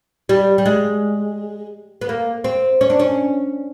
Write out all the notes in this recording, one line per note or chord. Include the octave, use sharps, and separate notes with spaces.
G3
G3
G#3
B3
A#3
C4
C#4
D4
C#4